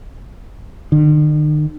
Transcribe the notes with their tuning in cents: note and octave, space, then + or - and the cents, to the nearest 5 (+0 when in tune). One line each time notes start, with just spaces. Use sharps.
D#3 -45